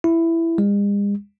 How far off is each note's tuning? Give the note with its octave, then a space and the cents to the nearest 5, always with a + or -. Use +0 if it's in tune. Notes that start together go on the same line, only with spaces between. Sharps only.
E4 +10
G#3 -45